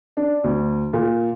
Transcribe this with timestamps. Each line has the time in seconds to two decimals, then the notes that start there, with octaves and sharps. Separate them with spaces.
0.17 D4
0.44 D2
0.93 A#2